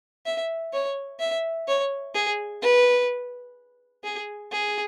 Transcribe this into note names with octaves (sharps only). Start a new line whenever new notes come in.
E5
C#5
E5
C#5
G#4
B4
G#4
G#4